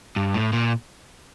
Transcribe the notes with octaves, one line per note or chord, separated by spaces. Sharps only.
G2
A2
A#2